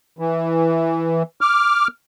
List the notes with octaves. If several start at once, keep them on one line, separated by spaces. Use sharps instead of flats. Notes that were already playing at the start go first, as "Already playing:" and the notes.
E3
D6 F6